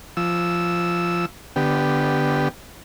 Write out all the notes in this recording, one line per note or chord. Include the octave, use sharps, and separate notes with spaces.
F3 E6
D3 B3 G4